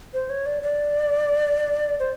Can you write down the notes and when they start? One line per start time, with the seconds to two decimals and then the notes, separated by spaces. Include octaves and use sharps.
0.14 C5
0.30 C#5
0.46 D5
0.62 D5
2.00 C5